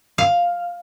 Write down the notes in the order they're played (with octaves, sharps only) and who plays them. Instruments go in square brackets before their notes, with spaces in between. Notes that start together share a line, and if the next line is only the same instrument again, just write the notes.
[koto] F5